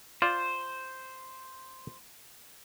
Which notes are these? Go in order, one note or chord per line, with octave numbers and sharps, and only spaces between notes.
F4 C5 D5